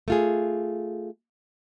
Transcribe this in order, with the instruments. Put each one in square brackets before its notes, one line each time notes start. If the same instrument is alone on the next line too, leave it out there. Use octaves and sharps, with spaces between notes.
[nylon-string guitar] A3 F4 G#4